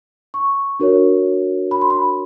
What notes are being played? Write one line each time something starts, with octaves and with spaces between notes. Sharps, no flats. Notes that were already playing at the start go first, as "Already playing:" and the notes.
C#6
D4 F#4 A#4 C#5
B5
C6
B5